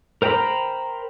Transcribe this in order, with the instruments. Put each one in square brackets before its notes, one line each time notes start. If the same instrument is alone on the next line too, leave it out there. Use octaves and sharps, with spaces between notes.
[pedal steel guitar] A#4 C5 G5 A#5 B5